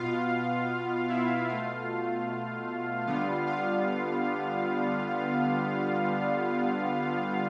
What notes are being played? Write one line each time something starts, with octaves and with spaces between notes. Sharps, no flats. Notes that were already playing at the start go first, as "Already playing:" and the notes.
Already playing: B2 B3 F4 F5
E4 E5
B2 A3 F4 F5
D3 G3 B3 F4 F5
F4 F5